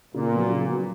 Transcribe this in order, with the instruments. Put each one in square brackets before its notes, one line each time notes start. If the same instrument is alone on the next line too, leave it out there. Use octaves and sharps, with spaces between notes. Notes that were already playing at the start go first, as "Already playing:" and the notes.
[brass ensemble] A#2 [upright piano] C#3
[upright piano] F#3 B3
C#3
F#3 B3